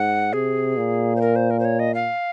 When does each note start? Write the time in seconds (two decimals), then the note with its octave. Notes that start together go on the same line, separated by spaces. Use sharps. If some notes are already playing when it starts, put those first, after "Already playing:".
Already playing: G#2 F#5
0.33 C3 G#4
0.77 A#2
1.16 C5
1.21 A#4
1.36 C5
1.50 A#4
1.60 C5
1.65 C#5
1.80 D#5
1.94 F5